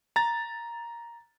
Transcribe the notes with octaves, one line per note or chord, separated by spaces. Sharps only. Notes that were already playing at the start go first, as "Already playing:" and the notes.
A#5 A6